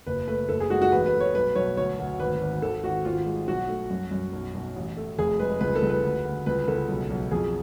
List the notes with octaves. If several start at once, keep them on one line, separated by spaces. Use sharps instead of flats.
F#1 B4
A3 B4
F#1 A4
G#4
G#3 F#4
F#4
A1 B4
B4
A3
C#5
B1 B4
B1 C#5
D2 C#5
D2
G#1 B4
G#1
G#1 A4
G#1 F#4
G#1 F4
G#3
B1 F#4
A3
F#2
F#2
B1
B1
A1
A3
F1 G#4
G#3 B4
C#2 B4
A4
C#2
B4
D2
D2
C#2 B4
C#2 A4
B1
B1
F2 G#4